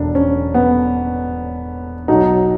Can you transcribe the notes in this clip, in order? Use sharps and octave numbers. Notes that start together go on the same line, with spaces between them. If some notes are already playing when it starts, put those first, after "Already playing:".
Already playing: E1 D4
C#4
B3
B1 B2 F#3 D#4